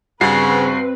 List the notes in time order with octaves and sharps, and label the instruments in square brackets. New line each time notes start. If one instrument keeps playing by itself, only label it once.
[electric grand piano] G2 F#4 [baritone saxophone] C#3 [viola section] C4 B4 [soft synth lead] C7